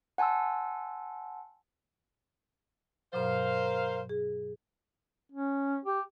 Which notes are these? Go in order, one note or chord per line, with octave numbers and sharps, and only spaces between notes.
F#5 G#5 A5 C6 E6
G2 B2 F#3 A#4 C5 F5
G#4
C#4
G4